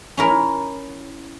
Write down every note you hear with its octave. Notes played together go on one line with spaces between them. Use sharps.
C#4 E4 A#4